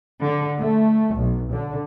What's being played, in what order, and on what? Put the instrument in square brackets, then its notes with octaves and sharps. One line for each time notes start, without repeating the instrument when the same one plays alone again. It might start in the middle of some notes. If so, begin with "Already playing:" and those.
[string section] D3
A3
B1
D3